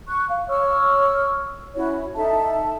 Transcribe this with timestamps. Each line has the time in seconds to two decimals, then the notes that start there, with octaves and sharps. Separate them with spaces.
0.08 C#6 F#6
0.29 F5
0.49 C#5 C#6 E6 F6
1.75 C#4 E4 F#4 C#5
2.15 D#4 A4 E5 A5